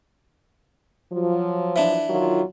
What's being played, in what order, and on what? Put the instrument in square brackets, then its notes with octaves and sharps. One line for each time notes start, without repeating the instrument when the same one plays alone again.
[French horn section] F3 F#3
[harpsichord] E3 D4
[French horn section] D#3 F#3 F4